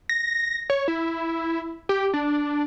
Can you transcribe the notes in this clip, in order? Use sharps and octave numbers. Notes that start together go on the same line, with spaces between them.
A#6
C#5
E4
G4
D4